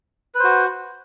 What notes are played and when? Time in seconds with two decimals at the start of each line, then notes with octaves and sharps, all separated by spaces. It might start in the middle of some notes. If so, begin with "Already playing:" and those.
0.35 B4
0.39 C5
0.44 F#4